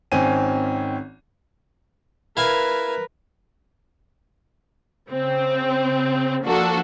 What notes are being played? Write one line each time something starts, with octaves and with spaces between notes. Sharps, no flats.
G#1 D#3 C4 C#4 G#5 D#7
E4 A#4 B4 F5 G#5
C#3 C4
F3 A#3 D4 F#4 A4